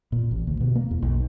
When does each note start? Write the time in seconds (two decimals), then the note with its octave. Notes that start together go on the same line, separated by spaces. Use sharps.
0.12 A#2
0.31 A1
0.47 D2
0.61 B2
0.75 A#3
0.91 E2
1.02 B1